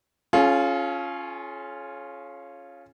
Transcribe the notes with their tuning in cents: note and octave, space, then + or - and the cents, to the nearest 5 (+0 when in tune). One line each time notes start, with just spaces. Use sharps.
C#4 -5 F4 +0 G#4 +45